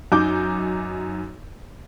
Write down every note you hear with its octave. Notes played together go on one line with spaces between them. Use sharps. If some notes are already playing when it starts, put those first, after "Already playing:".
F#2 D#4 D6 G6